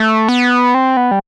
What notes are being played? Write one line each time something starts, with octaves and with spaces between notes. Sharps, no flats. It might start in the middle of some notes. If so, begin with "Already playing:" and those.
Already playing: A3
B3
C4
B3
G3